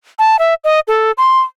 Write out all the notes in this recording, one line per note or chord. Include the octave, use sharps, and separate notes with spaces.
A5
E5
D#5
A4
C6